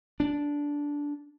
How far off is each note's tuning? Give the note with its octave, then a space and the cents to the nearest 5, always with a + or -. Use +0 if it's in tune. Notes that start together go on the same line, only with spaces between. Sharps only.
D4 -10